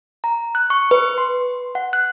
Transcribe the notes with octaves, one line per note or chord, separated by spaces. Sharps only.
A#5
F#6
C#6
B4
C6
F#5
F#6